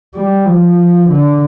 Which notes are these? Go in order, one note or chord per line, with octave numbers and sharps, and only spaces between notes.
G3
F3
D3